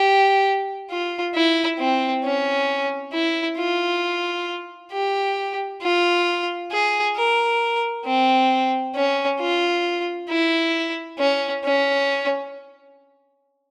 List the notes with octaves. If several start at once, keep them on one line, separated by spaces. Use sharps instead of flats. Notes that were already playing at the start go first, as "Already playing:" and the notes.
Already playing: G4
F4
E4
C4
C#4
E4
F4
G4
F4
G#4
A#4
C4
C#4
F4
E4
C#4
C#4